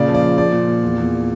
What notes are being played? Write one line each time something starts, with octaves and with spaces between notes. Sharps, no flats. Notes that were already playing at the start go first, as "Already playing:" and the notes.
Already playing: A#2 C#3 D5
F3
D5
F3
F3 D5
A#2
A#2
E2
E2